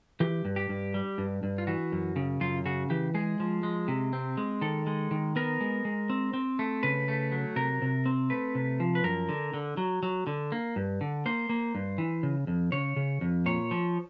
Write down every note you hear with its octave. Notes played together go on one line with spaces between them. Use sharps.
E3 G4
G2
G4
G2
G3
G2
G2
F4
E3 F#4
F#2
C#3
F#2 F4
C#3 F#4
E3 G4
G#3 G#4
F3
G#3
C3
C4
G#3
D#3 A4
G#3
D#3
B3 A#4
G#3
G#3
C4
C4
A3
C#3 B4
A3
F#3
C3 A#4
C3
C4
A3 B4
C3
F3
B4
F#2 A#4
D3
D3
F#3
F#3
D3
A#3
G2
D3
A#3 C5
A#3
G2
E3
C#3
F2
C#3 C#5
C#3
F2
A#2 C#5
F3